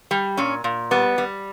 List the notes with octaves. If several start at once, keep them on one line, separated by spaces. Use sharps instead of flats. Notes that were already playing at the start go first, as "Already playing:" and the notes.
G3
A#2 C#4
A#2
G3 B3
G3